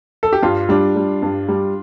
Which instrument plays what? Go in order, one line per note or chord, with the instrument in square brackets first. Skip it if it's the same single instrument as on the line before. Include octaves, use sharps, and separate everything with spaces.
[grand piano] A4
G4
[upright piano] G2 [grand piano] F4
[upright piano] G3 [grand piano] D4
[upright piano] G3
G2
G3